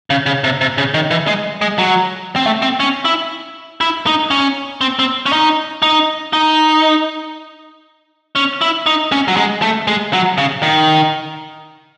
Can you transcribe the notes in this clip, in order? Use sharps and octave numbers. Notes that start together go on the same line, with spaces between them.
C#3
C#3
C3
C3
C#3
D#3
E3
G#3
G#3
F#3
C4
A3
C4
C#4
E4
E4
D#4
C#4
C4
C4
C#4
D#4
D#4
D#4
C#4
E4
D#4
C#4
F#3
G#3
A3
G#3
F#3
C#3
D#3